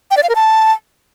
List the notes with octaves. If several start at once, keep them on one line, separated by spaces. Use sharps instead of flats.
G5
D5
F5
A#4
A5